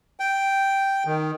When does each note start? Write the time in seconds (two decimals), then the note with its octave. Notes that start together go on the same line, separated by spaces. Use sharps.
0.20 G5
1.06 D#3